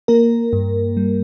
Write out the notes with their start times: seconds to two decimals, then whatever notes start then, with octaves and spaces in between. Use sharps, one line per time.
0.08 A#3 A#4
0.53 G2
0.97 G3